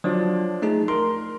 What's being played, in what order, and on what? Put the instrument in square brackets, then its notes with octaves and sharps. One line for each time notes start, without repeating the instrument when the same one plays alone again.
[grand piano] F3 D4 [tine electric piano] F#3
[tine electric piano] A3 D#4 G#4
[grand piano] A#4 [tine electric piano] C6